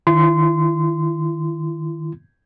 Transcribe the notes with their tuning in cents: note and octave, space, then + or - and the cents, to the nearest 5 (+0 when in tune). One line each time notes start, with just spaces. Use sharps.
D#3 +0 E4 +40 C6 -25